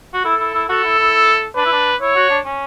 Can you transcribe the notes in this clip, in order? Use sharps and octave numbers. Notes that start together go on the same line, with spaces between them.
F#4
E4 A4
E4
E4
F#4 A4
E4
E4
D4 B4
E4
D4
E4 C#5
F#4
D4
C#4